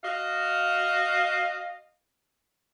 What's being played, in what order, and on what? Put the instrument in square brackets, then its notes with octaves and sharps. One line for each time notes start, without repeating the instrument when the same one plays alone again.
[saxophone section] F#4 D#5 F5